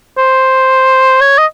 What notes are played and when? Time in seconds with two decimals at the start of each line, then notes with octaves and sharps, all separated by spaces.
0.17 C5
1.21 C#5
1.38 D#5